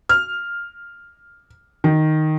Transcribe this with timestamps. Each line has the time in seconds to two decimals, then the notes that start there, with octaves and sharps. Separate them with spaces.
0.09 F6
1.84 D#3